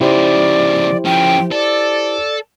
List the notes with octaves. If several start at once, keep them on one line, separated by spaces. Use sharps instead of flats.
C#3 F3 E4 G4 C5 D5
F3 C#4 G5
A4 D5